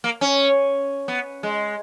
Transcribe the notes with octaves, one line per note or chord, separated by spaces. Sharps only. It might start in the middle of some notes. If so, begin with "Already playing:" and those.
A#3
C#4
B3
G#3